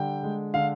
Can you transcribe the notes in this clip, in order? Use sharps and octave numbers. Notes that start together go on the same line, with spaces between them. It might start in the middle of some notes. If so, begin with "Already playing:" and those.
Already playing: D3 G3 G5
G#3
D3 F5